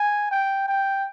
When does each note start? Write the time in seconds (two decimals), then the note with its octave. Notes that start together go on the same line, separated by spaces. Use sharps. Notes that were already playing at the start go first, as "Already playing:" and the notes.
Already playing: G#5
0.31 G5
0.68 G5